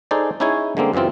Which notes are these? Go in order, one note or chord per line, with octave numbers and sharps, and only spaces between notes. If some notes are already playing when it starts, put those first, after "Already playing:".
D#4 G#4 A4 C5 D5
C#4 D#4 E4 G#4 C#5 G#5
D3 G#3 A#3 C4
F#2 C#3 E3 C4 F4